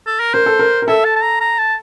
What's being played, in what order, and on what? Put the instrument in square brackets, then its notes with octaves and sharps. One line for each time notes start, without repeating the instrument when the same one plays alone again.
[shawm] A4
A#4
[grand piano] A#4 [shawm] C5
[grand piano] A4
A#4
A#4
[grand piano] A4 [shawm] E5
[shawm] A5
A5
A#5
A#5
A5